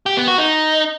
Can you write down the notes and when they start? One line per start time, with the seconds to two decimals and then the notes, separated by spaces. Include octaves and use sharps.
0.06 G4
0.17 B3
0.28 F#4
0.38 D#4